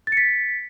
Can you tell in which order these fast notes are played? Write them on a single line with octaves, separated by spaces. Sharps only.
A6 C#7 B6